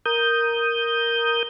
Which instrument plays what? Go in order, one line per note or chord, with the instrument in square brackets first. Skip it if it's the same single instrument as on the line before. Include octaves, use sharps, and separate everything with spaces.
[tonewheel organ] A#4 D#6 G6